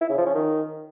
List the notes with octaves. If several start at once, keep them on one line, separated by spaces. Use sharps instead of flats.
E4
C#3
F3
C#4
D#3